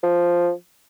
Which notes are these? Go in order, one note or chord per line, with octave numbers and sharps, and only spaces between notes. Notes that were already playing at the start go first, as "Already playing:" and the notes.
F3